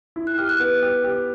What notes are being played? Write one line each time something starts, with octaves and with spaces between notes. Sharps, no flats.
E4
F#6
G4 F6
F#6
B3
G4
G4